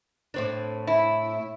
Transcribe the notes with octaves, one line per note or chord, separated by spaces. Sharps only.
A2 C4 D4
E4